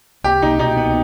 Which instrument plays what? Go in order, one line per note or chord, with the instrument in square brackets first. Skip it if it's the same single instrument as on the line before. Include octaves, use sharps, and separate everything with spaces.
[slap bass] C2 [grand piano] G4
[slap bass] C2 [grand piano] D#4
[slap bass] B2 [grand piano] D#4
[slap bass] B3